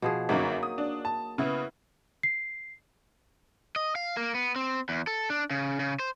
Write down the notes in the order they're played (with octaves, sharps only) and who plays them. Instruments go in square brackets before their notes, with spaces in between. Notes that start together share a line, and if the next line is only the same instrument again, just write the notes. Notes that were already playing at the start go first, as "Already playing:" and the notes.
[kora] B2 F3 G#4
[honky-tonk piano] G1 F#2 [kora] F#3 A#3 D#4
[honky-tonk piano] D#6
D4
A5
[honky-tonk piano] C#3 B3 [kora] E4 F#5
[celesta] C7
[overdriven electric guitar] D#5
F5
A#3
B3
C4
E2
A4
D4
C#3
C#3
C5